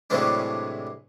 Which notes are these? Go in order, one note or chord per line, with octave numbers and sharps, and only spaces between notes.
A2 C3 E3 F#3 G#3 D4